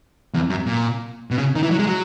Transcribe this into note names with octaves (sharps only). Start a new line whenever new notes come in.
E2
F#2
A#2
B2
C#3
D#3
E3
F#3
G#3
F#3